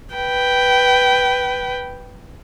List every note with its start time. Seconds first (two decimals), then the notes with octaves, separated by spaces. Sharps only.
0.15 B4 G5